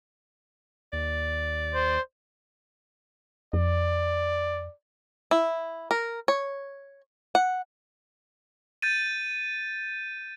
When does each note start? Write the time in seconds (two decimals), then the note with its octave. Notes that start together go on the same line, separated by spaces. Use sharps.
0.93 D#2 D5
1.75 C5
3.53 F2 D5
5.31 E4
5.91 A#4
6.28 C#5
7.35 F#5
8.82 G6 A6 D#7